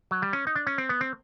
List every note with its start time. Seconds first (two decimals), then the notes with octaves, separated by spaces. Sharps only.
0.11 F#3
0.22 G3
0.33 C#4
0.47 D#4
0.56 D4
0.67 C#4
0.78 C4
0.89 B3
1.01 C4